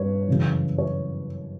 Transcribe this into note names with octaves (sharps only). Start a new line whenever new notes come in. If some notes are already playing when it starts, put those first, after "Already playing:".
Already playing: G2 B4 C#5
F#2 C#3 E3
C#5